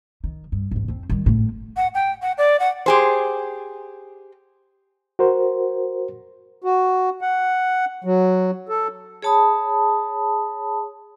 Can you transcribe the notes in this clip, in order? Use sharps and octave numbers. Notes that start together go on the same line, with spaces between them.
D#3
G2
G#1 F2
F2 C4
D#3 G3
G#1 A2
F#5
G5
F#5
D5
F#5
G4 G#4 C5
F#4 A#4 C5
F#4
F#5
F#3
A4
G#4 C#5 A5 B5 D#6